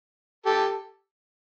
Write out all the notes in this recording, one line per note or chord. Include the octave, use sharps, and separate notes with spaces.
G4 A4